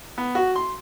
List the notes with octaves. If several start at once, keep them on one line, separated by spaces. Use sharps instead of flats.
B3
F#4
C6